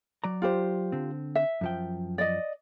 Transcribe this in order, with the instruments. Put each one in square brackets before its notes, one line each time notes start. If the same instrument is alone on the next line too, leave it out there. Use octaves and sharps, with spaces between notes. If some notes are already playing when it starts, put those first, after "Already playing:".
[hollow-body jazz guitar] F#3 D5 A#5
[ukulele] F4 G4 C5
[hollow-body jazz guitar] D3 C4
[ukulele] E5
[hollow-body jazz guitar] F#2 F3 G5
[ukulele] D5 D#5